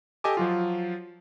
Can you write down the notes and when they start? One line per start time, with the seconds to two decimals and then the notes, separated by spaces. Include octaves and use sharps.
0.24 G4 A4 D#5 G#5 A5 D6
0.37 F3 F#3 F4